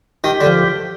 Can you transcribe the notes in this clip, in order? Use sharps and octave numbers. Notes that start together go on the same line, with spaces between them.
D#3 G4
D3
F3